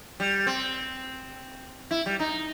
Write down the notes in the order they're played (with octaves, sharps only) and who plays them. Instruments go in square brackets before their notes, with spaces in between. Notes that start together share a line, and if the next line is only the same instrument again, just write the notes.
[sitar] G3
C4
E4
G3
D#4